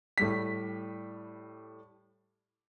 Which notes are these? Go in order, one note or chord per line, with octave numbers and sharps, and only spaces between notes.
A2 G3 B6